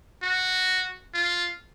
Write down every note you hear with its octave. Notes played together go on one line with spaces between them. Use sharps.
F#4
F4